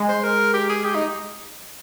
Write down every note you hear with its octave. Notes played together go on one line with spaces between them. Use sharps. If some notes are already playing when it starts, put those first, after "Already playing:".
Already playing: G#3
C5
A#4
G4
G#4
G4
D#4